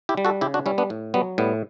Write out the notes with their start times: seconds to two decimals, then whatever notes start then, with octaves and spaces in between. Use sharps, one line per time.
0.09 E4 G4
0.17 G3
0.25 F#4 A4
0.41 C#3 E4 G4
0.54 D4 F#4
0.66 G3 C#4 E4
0.78 B3 D4
0.90 A2
1.14 F#3 G3 B3
1.38 A2 G3 B3